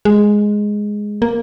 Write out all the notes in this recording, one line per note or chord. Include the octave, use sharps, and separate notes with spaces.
G#3
A#3